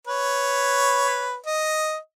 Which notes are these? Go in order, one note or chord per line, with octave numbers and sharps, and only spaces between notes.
B4 C#5
D#5